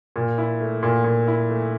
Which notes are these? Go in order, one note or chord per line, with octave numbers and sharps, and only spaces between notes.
A#2
E4
A3
A#2
A#2
E4
A3